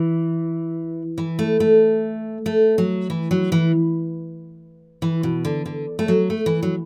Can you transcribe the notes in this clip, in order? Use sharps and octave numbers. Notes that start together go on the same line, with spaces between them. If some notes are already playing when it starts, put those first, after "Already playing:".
Already playing: E3
E3
A3
A3
A3
F#3
E3
F#3
E3
E3
B2
D3
D3
A3
F#3
A3
E3
F#3